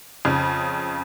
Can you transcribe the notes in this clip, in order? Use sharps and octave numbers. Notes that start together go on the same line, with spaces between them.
F2 C#3